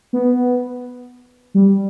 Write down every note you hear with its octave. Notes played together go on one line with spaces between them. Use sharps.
B3
G3